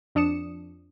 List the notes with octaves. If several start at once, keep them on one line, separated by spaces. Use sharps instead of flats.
F2 D4 D#6 C#7 E7